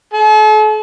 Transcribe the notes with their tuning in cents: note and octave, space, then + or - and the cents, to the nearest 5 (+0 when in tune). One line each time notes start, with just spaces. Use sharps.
A4 -45